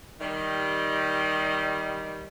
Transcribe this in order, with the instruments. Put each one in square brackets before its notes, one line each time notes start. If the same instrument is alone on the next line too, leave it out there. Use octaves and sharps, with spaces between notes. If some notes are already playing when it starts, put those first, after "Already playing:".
[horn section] D#3 G3